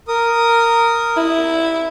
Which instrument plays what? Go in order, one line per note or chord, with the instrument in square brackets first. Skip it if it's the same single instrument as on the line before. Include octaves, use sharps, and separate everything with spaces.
[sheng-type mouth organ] A#4 D#6
[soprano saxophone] E4